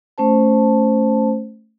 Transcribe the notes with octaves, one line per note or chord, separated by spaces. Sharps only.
A3 C#4 C5 A5